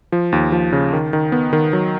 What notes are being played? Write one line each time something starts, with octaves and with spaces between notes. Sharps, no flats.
F3
D#2
F3
C#3
D#3
D#3
B3
D#3
F#3